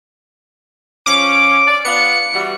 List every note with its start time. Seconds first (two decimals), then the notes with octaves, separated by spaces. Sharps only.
1.06 F3 C#4 D6
1.66 D5
1.85 B3 D4 F4 C#7
2.33 E3 G3 F#4